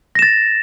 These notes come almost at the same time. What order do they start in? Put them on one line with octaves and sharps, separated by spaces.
A#6 E7 A6